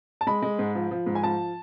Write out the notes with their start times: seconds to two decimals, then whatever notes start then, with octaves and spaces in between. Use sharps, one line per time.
0.21 A5
0.27 G#3 B5
0.42 G#3
0.59 G#2
0.75 F3
0.91 F3
1.06 G#2
1.15 G#5
1.23 F3 A5